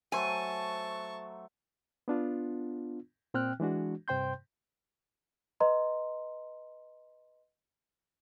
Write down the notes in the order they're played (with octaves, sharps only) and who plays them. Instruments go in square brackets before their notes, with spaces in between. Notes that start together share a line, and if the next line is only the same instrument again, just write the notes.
[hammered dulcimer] F#3 A3 C5 [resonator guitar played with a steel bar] G#5 [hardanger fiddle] A5 C#6
[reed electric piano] B3 D4 F4
A#2 C4 G5 F6 F#6
E3 G#3 D4 F#4
G2 C3 C5 G5 C6 G6
[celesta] B4 D#5 A#5 C6